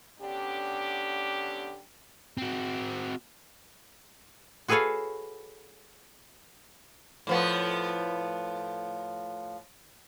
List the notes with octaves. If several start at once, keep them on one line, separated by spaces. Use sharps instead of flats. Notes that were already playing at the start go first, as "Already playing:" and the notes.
D3 B3 C#4 D4 G4
C4 F#4
F#4 G#4 A4 B4 C#5 F5
A2 F3 B3